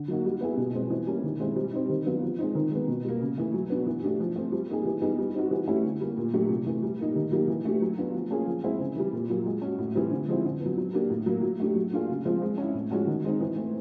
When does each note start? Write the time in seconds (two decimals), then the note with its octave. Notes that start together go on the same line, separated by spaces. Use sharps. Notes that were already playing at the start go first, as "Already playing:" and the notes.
Already playing: D3
0.08 F#3 A#3 D#4 F#4
0.25 G3
0.41 B3 E4 G#4
0.57 B2
0.74 G#3 C4
0.90 E3
1.07 G3 A#3 C#4
1.24 D#3
1.40 G#3 C4 E4
1.56 G3
1.73 C4 D#4
1.89 D#3
2.06 F#3 B3 D4 F4
2.22 F3
2.39 G#3 C4 D#4
2.55 D#3
2.71 G#3 B3
2.88 B2
3.05 G3 A#3
3.21 C#3
3.38 E3 A3
3.54 F#3
3.70 B3 D4 F#4
3.87 E3
4.03 A3 D4 G4
4.20 F3
4.36 A3 C4
4.52 G3
4.68 A#3 D#4 G#4
4.85 E3
5.01 G3 B3 D#4 G#4
5.18 G3
5.35 C4 D#4 F#4
5.51 E3
5.67 A3 C#4 E4 G4
5.85 D3
6.01 G3 A#3
6.17 A#2
6.33 F#3 A3 D4 G4
6.49 C3
6.66 E3 A3
6.83 G3
6.99 A#3 D#4
7.15 D#3
7.32 F#3 A#3 D#4 G4
7.48 E3
7.65 A3 D4 G4
7.82 F#3
7.98 B3 D4 F4
8.14 F3
8.30 A#3 C#4 F4 G#4
8.47 F3
8.63 G#3 C4 E4 G#4
8.79 C#3
8.96 E3 G3
9.13 A#2
9.30 F#3 A#3
9.46 G#3
9.62 C#4 F#4
9.79 A2
9.95 E3 G3 C4
10.11 D3
10.28 F3 G#3 C4 E4
10.45 D3
10.60 B3
10.66 F#3
10.77 F#3
10.93 A#3 D4 G4
11.10 A2
11.26 F#3 A#3
11.43 F#3
11.60 A3 D4 G4
11.75 F#3
11.93 A#3 D4 F4 G#4
12.09 C#3
12.25 F3 G#3 C4 F4
12.42 G#3
12.58 C#4 E4
12.74 A2
12.91 F3 G#3 C#4 F#4
13.07 D#3
13.24 G#3 C4 D#4
13.41 E3
13.57 A3 C4